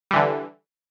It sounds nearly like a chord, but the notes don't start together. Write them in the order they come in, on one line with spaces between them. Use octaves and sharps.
G3 E3 D3